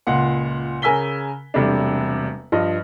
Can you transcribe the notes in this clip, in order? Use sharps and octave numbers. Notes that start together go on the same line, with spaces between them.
C#2 A#2 F#5 C6
C#3 A#4 G#5 E6 B6 G7
E1 C3 G3 A3 D4
G2 F3 D#5